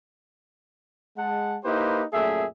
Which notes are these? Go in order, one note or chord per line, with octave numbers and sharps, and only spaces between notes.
G#3 F#5 A5
A#3 D#4 E4 G4 B4 C5
F#2 A#2 A3 G#4 E5